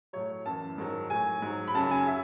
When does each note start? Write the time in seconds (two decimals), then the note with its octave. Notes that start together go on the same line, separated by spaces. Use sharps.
0.13 A2 F#3 C#5
0.46 F#2 E3 A5
0.78 G#2 D#3 F#3
1.10 A2 F#3 G#5
1.42 G#2 F#3
1.68 B5
1.74 F#2 C#3 F#3 A5
1.91 G#5
2.07 F#3 E5